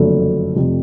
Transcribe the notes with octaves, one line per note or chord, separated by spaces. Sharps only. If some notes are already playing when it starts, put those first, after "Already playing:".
Already playing: F#1 F2 D3 F#3 A3
F1 F2 C3